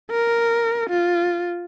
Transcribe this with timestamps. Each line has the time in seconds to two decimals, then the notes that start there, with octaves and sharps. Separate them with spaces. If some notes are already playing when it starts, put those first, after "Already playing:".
0.11 A#4
0.90 F4